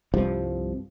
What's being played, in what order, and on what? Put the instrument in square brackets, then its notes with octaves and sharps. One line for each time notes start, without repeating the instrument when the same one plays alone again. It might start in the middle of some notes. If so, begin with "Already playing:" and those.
[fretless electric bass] C2 G2 C3 F3